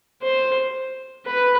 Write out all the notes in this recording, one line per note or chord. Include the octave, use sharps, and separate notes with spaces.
C5
B4